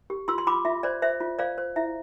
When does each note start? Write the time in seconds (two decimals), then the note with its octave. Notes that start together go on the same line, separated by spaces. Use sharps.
0.10 G4
0.28 F4 C6 E6
0.38 C6
0.47 F4 B5 D6
0.65 F4 E5
0.83 C5 D5
1.02 C5 E5
1.20 F4
1.39 C5 D5 F5
1.58 C5
1.76 E4 E5